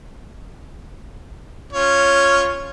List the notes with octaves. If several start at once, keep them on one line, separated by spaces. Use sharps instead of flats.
C#4 F4 C#5